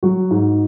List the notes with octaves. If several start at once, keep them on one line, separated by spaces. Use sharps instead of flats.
F#3 F#4
G#2